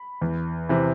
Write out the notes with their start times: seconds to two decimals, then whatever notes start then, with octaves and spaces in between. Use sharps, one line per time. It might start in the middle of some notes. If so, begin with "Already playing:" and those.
Already playing: B5
0.21 E2
0.69 C3 E3